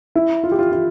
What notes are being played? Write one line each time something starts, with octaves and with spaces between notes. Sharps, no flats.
E4
F4
G4
F4
F4